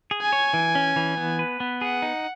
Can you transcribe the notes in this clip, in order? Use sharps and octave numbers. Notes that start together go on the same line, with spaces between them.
G#4
G#5
C#5
E3
C#4
E3
B3
B4
B3
G#4 F#5
D#4